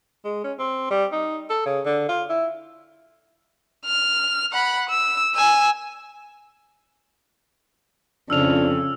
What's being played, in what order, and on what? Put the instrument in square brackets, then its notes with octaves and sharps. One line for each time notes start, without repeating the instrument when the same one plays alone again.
[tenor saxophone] G#3
C#4
C4
G3
D#4
A4
C#3
D3
F4
E4
[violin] F6
F#5 B5
E6
G#5 E6
[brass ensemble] F2 [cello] C#3 [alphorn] D4 [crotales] E6 F6 F7